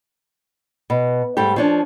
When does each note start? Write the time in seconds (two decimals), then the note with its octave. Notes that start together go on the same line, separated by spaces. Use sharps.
0.90 B2
1.37 G#2 G3 A3 G4
1.56 F3 C#4 D4